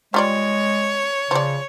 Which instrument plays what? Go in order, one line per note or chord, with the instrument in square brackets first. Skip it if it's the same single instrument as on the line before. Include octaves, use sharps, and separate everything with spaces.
[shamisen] G3 F4 D5 [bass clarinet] G#3 [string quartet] C#5
[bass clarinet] C#3 [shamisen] F3 D5